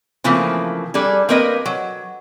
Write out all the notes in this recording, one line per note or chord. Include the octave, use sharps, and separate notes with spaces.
C#3 E3 F3 A3 A#3 C4
G3 D4 G#4 A4
A#3 C4 A#4 B4 D#5
F#3